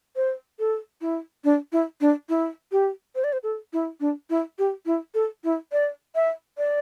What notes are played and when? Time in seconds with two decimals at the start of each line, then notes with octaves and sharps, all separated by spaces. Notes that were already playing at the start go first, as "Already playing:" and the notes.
0.16 C5
0.59 A4
1.01 E4
1.44 D4
1.72 E4
2.01 D4
2.29 E4
2.72 G4
3.15 C5
3.24 D5
3.33 C5
3.43 A4
3.73 E4
4.00 D4
4.30 E4
4.59 G4
4.86 E4
5.14 A4
5.44 E4
5.72 D5
6.15 E5
6.58 D5